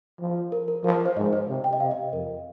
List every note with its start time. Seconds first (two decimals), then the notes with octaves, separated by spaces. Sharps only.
0.20 F3
0.52 A#4
0.68 A#4
0.84 F3 A#4
0.95 A#4
1.06 C5
1.16 G#2 D#5
1.33 C5
1.48 C3
1.64 G5
1.73 D#5
1.80 C3 F5
1.91 D#5
2.13 F2 A#4